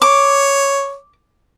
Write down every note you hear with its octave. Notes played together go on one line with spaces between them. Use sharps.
C#5 D6